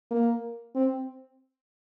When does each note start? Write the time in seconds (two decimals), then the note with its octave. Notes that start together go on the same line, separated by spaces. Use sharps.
0.11 A#3
0.76 C4